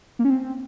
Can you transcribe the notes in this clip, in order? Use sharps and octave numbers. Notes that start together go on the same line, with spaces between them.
A#3
C#4
C4